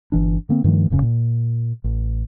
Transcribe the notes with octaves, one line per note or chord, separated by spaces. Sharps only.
G1 E3 D4
D3 A#3 C4
G2 D#3 F3 A3
D1 F#2 C#3 C#4
A#2
A1